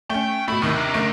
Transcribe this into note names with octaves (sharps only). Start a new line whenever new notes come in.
A3 C#4 G5
B2 A3 E4
D#2 A2 C3 D#3
D4 A#4
F#1 A3 D7